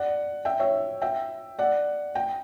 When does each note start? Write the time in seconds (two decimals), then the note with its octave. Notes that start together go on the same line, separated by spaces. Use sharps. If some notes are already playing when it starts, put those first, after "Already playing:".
Already playing: D5 F#5
0.45 E5 G5
0.60 C#5 E5
1.02 E5 G5
1.59 D5 F#5
2.15 G5